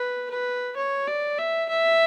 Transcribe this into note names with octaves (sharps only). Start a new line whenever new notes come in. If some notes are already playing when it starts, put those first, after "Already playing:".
Already playing: B4
B4
C#5
D5
E5
E5